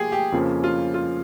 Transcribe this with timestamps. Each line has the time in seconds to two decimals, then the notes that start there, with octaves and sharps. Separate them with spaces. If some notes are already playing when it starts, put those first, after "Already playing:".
Already playing: F3 A#3 G4 G#4
0.12 G4
0.32 F2 C#3 F3 A#3 C#4
0.64 F4
0.94 F4